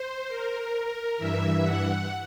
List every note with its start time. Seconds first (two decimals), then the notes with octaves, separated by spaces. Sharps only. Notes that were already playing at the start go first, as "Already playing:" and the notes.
Already playing: C5
0.28 A#4
1.17 G2 E3 E5
1.63 F#5